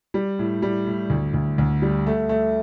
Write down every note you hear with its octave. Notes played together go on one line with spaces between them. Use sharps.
G3
A2
G3
A2
D2
D2
D2
G3
A3
A3